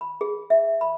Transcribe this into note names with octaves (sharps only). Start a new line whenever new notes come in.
B5
G#4
E5
B5